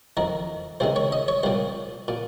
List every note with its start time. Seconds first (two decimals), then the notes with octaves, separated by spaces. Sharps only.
0.17 F2 D#3 A#4
0.80 C#2 C3 D#3 C5
0.96 C#5
1.12 D#5
1.28 C#5
1.43 C2 A#2 C5
2.08 A#2